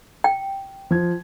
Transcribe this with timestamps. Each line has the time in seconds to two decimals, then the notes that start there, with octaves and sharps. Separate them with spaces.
0.24 G5
0.91 F3 G#6